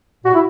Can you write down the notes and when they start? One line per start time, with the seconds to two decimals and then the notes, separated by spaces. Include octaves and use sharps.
0.25 A#2 F#4
0.34 E4